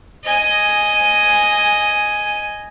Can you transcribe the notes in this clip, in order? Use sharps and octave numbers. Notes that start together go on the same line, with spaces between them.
D#5 G#5